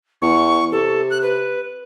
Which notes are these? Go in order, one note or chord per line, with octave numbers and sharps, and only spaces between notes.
E2 C#6
C3 A4
F#6
B4